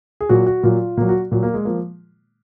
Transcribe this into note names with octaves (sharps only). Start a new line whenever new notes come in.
G#4
A#2 F#3 F#4
F#4
A#2 F#3 F4
A#2 F#3 A#3
F#4
A#2 F#3
A#3
G#3
F3 A#3